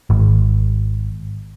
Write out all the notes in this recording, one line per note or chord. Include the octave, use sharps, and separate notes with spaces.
G#1